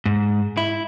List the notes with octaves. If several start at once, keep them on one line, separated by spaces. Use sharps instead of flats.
G#2
E4